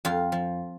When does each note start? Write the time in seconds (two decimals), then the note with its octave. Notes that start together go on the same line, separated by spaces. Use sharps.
0.05 F2 F4
0.32 F3